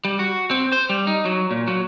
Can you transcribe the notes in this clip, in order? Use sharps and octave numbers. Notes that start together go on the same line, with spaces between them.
G3
F#4
C4
C5
G3
D#4
F#3
A#2
F#3